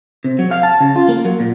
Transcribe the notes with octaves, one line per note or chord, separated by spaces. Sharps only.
C3
F#3
F5
A5
C#3
F4
A#3
F#3
A#2